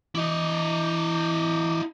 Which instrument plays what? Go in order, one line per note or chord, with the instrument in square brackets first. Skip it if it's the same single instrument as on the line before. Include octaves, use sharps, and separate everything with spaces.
[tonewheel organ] E3 D6 [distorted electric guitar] E4 D#5